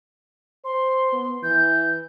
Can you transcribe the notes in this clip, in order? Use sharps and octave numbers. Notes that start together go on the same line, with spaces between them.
C5 C6
B3
E3 G6